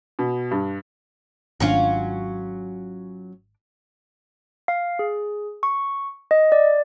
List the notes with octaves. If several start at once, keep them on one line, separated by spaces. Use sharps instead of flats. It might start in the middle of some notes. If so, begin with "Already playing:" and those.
B2
G2
G#1 F#3 C#4 D4 F4
F5
G#4
C#6
D#5
D5